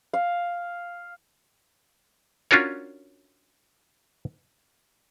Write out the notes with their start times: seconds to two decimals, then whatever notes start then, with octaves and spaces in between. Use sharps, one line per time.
0.13 F5
2.51 C#4 D4 F4 F#4 A#4 C#5